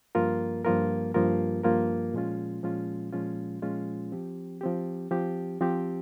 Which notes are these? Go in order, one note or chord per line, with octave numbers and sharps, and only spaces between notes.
G2 F3 A#3 F4 A#4
G2 F3 A#3 F4 A#4
G2 F3 A#3 F4 A#4
G2 F3 A#3 F4 A#4
A#2 F3 G#3 C#4 F4
A#2 F3 G#3 C#4 F4
A#2 F3 G#3 C#4 F4
A#2 F3 G#3 C#4 F4
F3 C4 G4
F3 C4 G4
F3 C4 G4
F3 C4 G4